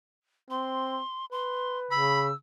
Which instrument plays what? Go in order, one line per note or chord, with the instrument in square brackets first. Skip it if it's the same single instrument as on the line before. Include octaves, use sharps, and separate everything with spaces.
[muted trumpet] C4 [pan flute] C6
[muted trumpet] B4 [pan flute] C6
[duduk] C#3 [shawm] B5 [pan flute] E6